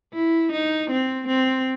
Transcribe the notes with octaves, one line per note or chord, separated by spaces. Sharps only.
E4
D#4
C4
C4